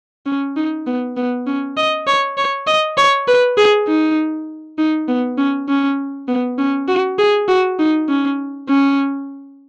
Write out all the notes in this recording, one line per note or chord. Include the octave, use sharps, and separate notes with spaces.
C#4
D#4
B3
B3
C#4
D#5
C#5
C#5
D#5
C#5
B4
G#4
D#4
D#4
B3
C#4
C#4
B3
C#4
F#4
G#4
F#4
D#4
C#4
C#4